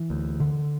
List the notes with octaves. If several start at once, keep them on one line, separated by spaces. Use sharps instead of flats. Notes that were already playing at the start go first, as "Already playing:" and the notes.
Already playing: E3
D2
D3